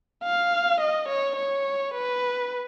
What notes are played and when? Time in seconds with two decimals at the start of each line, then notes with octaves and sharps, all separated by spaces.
0.24 F5
0.80 D#5
1.08 C#5
1.36 C#5
1.94 B4